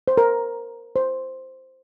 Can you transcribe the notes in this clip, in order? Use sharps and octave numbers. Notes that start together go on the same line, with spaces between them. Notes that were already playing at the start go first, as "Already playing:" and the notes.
C5
A#4
C5